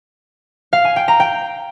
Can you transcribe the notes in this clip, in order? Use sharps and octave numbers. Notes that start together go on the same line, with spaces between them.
F5
G#5
G5
A#5
G5